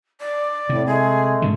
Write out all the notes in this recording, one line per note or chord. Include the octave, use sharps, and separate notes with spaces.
D5
A2 C3
G#3 A3 G#4
G#2 B2 D3